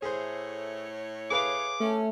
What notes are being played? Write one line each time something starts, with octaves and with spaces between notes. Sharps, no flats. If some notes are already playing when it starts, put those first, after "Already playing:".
A2 A3 G#4 C5 C#5
G#4 B4 F5 D6
A3 C#4